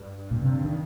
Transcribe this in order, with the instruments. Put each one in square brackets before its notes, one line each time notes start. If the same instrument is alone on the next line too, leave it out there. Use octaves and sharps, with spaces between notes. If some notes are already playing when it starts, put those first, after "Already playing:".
Already playing: [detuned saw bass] G2
[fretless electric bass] A#2
C3
D3
D#3